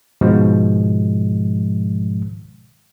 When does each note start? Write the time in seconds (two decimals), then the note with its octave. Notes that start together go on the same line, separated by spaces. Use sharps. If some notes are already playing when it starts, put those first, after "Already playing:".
0.21 G#2 B2 D#3 F3 G#3